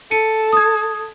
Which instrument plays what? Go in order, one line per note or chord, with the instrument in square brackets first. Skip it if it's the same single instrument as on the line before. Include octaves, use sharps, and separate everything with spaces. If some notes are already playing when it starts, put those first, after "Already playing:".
[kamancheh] A4 [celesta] C#7 D#7
[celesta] D#6 G#6